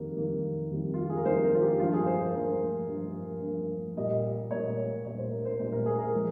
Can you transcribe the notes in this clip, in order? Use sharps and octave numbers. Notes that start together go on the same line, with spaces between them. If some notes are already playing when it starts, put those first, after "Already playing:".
Already playing: F2 D#3 G3 A#3
F2 D#3 G3 A#3
F2 D#3 G3 A#3
F4
G4
G#4
A#4
F2 D#3 G3 A#3 C5
A#4
F4
G4
G2 F3 A#3 F4
G#4
C5
A#4
C5
G2 F3 A#3 A#4
G2 F3 A#3
G2 F3 A#3
A#2 G3 A#3 D#5
A#2 G3 A#3 C#5
A#2 G3 A#3 C#5
C5
A#4
C5
A#2 G3 A#3 C5
A#4
G#4
A#4
F3 G#3